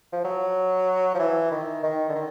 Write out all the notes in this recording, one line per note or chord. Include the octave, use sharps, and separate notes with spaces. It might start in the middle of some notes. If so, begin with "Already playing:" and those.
F3
F#3
F3
E3
D#3
D#3
D3
D#3